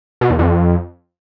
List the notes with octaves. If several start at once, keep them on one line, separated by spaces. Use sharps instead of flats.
B2
E2
F2